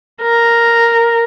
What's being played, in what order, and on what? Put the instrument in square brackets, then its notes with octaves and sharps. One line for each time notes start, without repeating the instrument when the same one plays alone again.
[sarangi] A#4